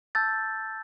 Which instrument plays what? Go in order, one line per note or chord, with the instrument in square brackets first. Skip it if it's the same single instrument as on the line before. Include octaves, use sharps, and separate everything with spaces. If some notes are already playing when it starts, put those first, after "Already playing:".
[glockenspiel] A5 E6 G6 A6